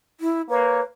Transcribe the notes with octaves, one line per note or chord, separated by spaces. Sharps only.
E4
A#3 B4 C#5